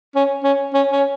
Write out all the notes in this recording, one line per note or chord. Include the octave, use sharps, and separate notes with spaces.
C#4
C#4
C#4
C#4